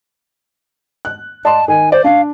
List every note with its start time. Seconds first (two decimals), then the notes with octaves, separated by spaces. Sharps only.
1.05 F#6
1.45 D5 D#5 A5 C6
1.68 D#3 G#5
1.92 C5 D5
2.04 D4 F5